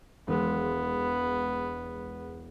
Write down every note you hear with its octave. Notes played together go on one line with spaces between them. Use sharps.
E1 G#3 B3